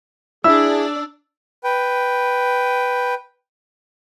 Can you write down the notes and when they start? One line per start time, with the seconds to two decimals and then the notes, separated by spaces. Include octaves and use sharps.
0.44 D4 E4 G#4 D5 E6
1.64 B4 G5